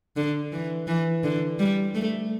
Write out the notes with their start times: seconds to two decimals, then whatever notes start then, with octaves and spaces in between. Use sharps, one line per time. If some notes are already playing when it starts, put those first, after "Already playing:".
0.17 D3
0.52 E3
0.88 E3
1.24 D3
1.59 G3
1.95 A3